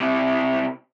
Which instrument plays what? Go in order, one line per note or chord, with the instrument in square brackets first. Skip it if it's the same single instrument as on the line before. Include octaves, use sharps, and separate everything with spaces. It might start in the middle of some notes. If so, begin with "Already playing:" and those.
[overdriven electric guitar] C3 E4